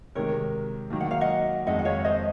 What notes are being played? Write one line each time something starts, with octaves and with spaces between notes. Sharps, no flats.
C3 D#3 G#3 A#4 C#5
D#3 F#3 A#3
F#5
F5
D#5 F#5
F2 D#3 G#3 D#5 F#5
F#5
C#5 F5
C5 D#5